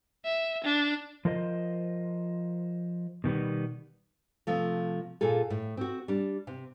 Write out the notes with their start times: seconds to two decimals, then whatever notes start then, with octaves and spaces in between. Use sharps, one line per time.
0.24 E5
0.64 D4
1.25 F3 F4 A#4 C5 D#5
3.24 B2 D#3 G3 B3
4.47 C3 F3 A3
5.21 A#2 F4 G#4 A4
5.50 A2
5.77 C4 F#4
6.08 G3 D4
6.47 C3